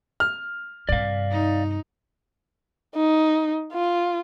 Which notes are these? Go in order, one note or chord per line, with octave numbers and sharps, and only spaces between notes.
F6
G2 C3 D5 F5
D#4
D#4
F4